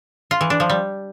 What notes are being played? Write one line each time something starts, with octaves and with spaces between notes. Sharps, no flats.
F4
E3
D4
F3
G3